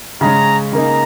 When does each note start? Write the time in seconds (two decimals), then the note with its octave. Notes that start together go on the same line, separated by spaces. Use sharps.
0.21 C#3 G#3 C#4 A#5
0.72 C#3 A#3 D#4 A#5